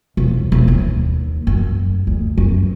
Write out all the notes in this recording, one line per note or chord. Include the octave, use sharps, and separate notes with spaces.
E1
E1
D#2
F#2
D2
F#2